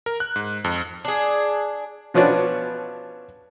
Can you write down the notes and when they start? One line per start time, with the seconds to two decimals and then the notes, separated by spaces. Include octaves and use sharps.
0.06 A#4
0.20 F#6
0.36 G#2
0.64 F2
1.04 D4 G#4
2.14 B2 F3 B3 C#4 D4